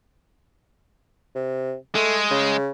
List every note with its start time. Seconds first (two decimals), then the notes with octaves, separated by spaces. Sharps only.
1.35 C3
1.95 G#3 A3
2.31 C#3